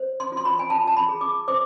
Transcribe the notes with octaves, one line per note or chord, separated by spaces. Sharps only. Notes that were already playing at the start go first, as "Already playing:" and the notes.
Already playing: C5
C6
F4
C6
B5
G#5
F4 A5
A5
B5
G#4
D6
C5 D6